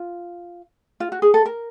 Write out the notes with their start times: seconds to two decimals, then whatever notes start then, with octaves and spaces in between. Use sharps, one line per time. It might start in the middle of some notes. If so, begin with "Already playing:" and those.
Already playing: F4
1.00 F4
1.12 F#4
1.22 G#4
1.34 A4
1.46 A#4